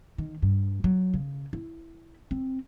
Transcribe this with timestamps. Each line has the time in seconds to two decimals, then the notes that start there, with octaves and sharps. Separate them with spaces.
0.18 D#3
0.42 G2
0.84 F#3
1.14 C#3
1.53 E4
2.31 C4